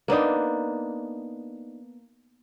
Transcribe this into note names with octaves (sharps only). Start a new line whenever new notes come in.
A#3 B3 D4 D#4